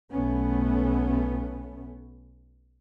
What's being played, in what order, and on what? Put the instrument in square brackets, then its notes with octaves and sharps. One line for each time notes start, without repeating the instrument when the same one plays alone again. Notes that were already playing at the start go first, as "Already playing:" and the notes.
[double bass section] B1 A3 B3 C#4